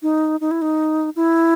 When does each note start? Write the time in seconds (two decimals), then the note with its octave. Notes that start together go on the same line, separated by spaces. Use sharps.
0.03 D#4
0.41 D#4
0.51 E4
0.62 D#4
1.16 E4